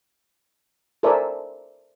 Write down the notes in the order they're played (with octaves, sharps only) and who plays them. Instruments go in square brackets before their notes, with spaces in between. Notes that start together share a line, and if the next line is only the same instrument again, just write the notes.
[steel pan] A4 A#4 C5 D5 E5 G#5